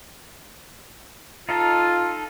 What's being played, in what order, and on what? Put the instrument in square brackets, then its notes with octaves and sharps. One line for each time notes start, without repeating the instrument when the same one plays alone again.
[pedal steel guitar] D#4 A4 [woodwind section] F4